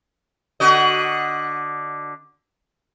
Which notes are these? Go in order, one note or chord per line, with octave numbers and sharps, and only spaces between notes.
D3 F#4 D#5